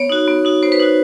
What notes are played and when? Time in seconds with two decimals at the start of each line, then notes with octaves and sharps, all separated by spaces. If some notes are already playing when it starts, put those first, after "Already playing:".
Already playing: B3 C#5
0.10 D#4 F#4
0.28 B3
0.45 D#4 F#4
0.63 B3 C5
0.72 B4
0.80 D#4 F#4 C5